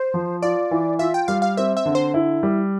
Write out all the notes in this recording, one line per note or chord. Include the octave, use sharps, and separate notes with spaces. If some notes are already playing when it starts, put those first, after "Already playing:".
Already playing: C5
F3
F4 D5
E3
F4 E5
G5
G3 F5
F5
C4 E5
E5
D3
C5
E4
G3